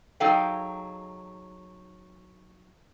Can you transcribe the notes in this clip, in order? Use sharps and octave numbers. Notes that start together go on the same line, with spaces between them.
F#3 D#4 G#4 A4 F5 G5